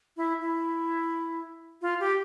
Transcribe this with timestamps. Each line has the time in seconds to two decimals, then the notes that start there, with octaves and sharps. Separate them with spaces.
0.17 E4
0.41 E4
1.82 F4
2.00 G4